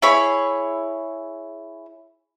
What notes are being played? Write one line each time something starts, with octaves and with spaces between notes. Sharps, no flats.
E4 G#4 C#5 B5